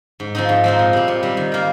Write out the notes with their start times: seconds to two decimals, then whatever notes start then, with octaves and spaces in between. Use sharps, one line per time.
0.20 G#2
0.35 F3 C4 D#4
0.49 G#2
0.64 F3 C4 D#4
0.79 A#2
0.93 G3 C4
1.08 A#2
1.23 G3 C4
1.37 D#3
1.52 A#3 F4